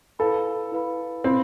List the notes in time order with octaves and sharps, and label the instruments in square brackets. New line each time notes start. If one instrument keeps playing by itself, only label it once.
[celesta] E4 B4 F5 B5 [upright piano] A4
[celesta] E4 B4 F5 B5
[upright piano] C4 [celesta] E4 B4 F5 B5